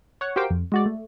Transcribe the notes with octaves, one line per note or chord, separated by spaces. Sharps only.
C#5 F#5
F#4 G4 A#4 C5 F5 G5
F2
G#3 F#4 D5
A3